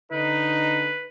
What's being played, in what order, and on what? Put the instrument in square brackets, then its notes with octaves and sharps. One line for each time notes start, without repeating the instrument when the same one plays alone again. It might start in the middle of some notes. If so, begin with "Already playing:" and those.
[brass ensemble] D3 D#4 [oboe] B4